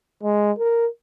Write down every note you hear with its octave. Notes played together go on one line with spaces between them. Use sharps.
G#3
A#4